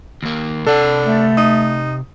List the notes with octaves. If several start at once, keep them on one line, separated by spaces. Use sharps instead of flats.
D#2 A#3
C3 D4 A4 F#5
A3
D#4 D#6